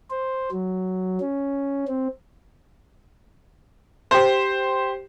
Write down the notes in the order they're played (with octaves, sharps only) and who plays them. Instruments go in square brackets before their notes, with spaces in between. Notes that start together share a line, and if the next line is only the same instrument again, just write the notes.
[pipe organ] C5
F#3
C#4
C4
[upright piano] G4 C5